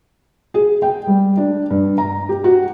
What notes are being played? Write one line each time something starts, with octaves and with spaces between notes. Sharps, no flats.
G#4
G5
G3
D4
G2
A#5
G4
F#4